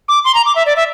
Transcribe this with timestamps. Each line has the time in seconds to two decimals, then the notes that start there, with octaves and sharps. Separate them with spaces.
0.08 D6
0.25 C6
0.35 A#5
0.45 D6
0.56 E5
0.66 D5
0.76 E5